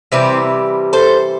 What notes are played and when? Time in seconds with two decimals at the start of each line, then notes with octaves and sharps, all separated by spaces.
0.12 C3 E3 G3 C4 E4
0.93 A4 C5